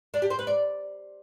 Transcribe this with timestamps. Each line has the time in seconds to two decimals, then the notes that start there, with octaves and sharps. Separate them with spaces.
0.14 D4
0.22 G4
0.30 C5
0.39 B4
0.47 D5